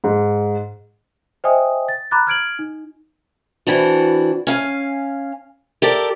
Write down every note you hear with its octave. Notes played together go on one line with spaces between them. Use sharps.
G#2
C5 D#5 E5 G5 G#5 D#6
A6
A#5 B5 D6 F#6 A6
F6 G#6 D7 F#7
D#4
E3 C4 D4 F#4
C#4 F5 G#5
G4 A4 A#4 D5